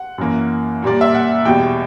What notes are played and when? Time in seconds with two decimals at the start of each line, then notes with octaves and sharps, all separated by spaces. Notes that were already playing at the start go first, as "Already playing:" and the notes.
Already playing: F#5
0.18 F#2 E3 A#3
0.83 A#2 G3 A#3 D5
1.01 E5
1.15 F#5
1.45 E2 B2 G3 G5